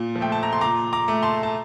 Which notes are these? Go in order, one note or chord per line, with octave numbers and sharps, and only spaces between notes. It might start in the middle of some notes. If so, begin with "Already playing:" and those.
Already playing: A#2
F3
A3 G5
A5
A#5
C6
A#2 A#5 D6
A#5 D6
A3
A5 C6
A5